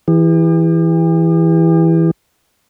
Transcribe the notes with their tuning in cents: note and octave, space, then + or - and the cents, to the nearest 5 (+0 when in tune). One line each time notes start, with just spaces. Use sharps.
E3 +0 G4 +45